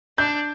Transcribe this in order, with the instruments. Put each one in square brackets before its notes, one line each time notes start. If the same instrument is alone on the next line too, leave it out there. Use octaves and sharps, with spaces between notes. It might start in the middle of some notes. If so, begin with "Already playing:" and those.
[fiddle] D4 [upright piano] G6